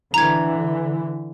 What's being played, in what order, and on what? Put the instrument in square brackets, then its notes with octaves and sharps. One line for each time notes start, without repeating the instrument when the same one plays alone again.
[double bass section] D3 E3 [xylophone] A#5 G#6